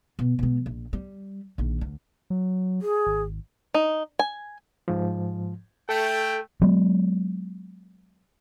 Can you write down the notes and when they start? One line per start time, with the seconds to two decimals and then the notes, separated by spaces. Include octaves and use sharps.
0.19 B2
0.39 B2 G#3
0.66 A#1
0.93 G3
1.58 A#1 D#3
1.81 D2
2.30 F#3
2.82 G#4
3.06 G#1
3.74 D#4
4.19 G#5
4.88 G#2 F3
5.89 A3 A4 G5
6.62 F#3 G#3 B3